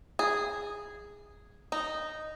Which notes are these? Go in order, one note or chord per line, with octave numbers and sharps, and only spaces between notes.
G#4
D#4